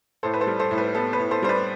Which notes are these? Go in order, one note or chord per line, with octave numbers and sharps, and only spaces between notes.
A2 A4 C5
B4
A4 C5
G3
A4 C5
A2
B4
B3 A4
B4
A2
A4 C5
G3 C5
B4 D5